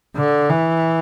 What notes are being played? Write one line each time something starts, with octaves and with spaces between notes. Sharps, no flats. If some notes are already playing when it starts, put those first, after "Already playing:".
D3
E3